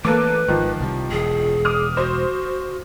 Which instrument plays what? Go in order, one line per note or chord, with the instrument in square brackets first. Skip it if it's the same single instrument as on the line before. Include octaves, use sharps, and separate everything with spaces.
[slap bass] E3 A3 [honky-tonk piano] A#3 A4 D6 [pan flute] B4
[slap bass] G#1 [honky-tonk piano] D#3 F3
[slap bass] C2 C3 G3
[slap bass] E1 [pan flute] G#4
[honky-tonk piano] D6 D#6 F6
[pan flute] F#4 [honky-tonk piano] C5